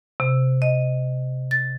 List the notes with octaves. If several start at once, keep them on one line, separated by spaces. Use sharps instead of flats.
C3
D#5
A6